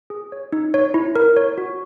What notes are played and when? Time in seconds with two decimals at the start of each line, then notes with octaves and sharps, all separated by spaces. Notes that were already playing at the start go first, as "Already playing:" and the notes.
0.10 G#4
0.32 C#5
0.52 D#4
0.74 C#5
0.94 E4
1.16 A#4
1.37 C#5
1.58 F#4